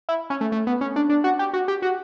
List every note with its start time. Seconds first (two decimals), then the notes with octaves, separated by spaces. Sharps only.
0.09 E4
0.30 C#4
0.41 A3
0.52 A3
0.67 B3
0.81 C#4
0.96 D4
1.09 D4
1.24 F#4
1.39 G4
1.53 F#4
1.68 G4
1.82 F#4